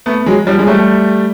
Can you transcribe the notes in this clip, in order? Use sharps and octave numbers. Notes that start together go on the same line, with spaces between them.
A3 B3
F#3 G#3
F3 G3
G#3
G3 A3